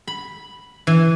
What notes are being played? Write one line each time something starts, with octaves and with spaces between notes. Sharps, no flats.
B5
E3